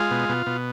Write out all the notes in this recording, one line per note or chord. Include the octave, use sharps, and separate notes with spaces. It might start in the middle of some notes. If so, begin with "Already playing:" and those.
Already playing: G#3 F4
B2
B2
B2